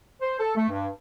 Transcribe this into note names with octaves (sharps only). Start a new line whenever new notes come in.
C5
A4
A3
G2